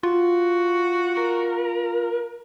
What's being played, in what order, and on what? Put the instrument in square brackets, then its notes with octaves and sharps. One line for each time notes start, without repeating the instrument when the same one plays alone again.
[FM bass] F4 [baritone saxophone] F#4
[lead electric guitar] A#4